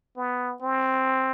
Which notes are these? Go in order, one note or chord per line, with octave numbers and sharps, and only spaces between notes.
B3
C4